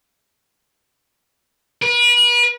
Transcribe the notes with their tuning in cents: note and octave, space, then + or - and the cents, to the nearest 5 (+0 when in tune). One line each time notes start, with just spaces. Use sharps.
B4 -40